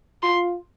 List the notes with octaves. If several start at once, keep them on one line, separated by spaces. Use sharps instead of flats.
F4 C6